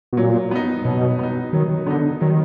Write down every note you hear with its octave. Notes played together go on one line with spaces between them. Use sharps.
B2
A#2 F#3
B3 D#4
B2 F#3
B3 D#4
D#3 F#3
D3 B3 D#4
D#3 F#3